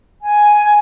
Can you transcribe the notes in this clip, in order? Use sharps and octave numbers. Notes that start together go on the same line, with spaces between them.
G#5